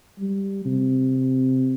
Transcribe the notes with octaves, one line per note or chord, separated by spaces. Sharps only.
G3
C3